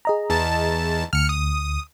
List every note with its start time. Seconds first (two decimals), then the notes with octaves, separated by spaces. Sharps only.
0.05 G#4 D#5 A#5
0.30 E2 A5
1.13 D2 F6 C#7
1.29 D#6